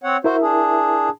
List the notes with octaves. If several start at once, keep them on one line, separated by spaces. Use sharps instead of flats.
C4 C#5 F#5
E4 F#4 A#4 C5 E5
D4 G#4